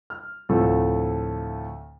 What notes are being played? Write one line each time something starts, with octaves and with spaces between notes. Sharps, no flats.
F6
D2 A2 C3 F3 A3 A4